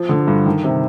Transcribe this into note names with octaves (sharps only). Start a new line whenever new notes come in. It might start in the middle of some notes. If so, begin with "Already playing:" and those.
Already playing: F3
D3
G2
D#3
C3